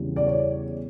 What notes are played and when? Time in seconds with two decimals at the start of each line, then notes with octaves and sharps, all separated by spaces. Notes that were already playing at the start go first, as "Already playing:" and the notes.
Already playing: E2 C#3 E3 G3
0.16 D5
0.27 C#5